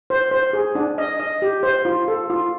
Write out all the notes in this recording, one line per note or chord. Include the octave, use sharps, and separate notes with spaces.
C5
C5
G#4
D4
D#5
D#5
G4
C5
F4
A4
F4